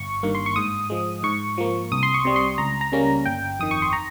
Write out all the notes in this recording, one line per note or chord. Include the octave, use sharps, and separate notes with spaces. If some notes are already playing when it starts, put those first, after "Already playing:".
Already playing: G1 C#6
G2 D#3 A#3
C6
C#6
G#2 D#6
F3 G#3
G#2 C#6
F3 A#3
C2 D#6
C6
C#6
C3 G3
C6
C#2 A#5
A#5
C#3 G3 A#3 C#4
G1 G5
F2 D#3 D#6
C#6
C6
A#5